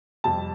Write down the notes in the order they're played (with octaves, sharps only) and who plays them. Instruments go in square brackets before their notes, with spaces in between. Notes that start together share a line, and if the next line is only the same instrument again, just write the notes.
[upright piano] F2 C3 G3 A5